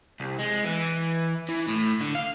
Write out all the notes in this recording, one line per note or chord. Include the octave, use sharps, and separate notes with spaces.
C2
G#3
E3
E3
A2
D3
F5